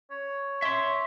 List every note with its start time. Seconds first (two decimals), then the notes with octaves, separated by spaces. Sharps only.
0.11 C#5
0.62 C#5 E5 C6